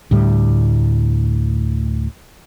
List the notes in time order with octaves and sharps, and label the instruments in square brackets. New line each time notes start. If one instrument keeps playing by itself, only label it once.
[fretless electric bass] D2 A2 G3